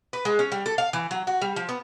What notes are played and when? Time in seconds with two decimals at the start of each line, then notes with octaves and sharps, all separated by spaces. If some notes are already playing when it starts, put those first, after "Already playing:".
0.13 B4
0.25 G#3
0.39 C#4
0.52 G3
0.66 A4
0.78 F5
0.93 E3
1.11 F#3
1.27 F#4
1.42 G3
1.56 F3
1.69 B3